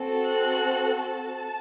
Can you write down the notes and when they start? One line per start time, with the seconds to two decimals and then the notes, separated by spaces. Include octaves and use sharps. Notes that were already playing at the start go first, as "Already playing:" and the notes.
Already playing: C4 F#4 A4
0.26 F#6
0.99 A5